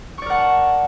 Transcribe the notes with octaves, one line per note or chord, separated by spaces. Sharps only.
A#4 D5 F#5 A5 C#6